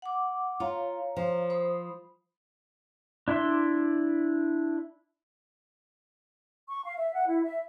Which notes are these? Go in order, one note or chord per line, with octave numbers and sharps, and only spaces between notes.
F#5 D6
F4 C#5 F5 A#5
F3
C5 B5 D#6
D4 E4 D5 E5 C6
C#6
F5
E5
F#5
E4
E5